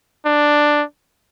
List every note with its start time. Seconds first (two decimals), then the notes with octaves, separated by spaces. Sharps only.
0.26 D4